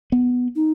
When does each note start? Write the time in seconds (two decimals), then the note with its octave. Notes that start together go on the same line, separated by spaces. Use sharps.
0.12 B3
0.56 D#4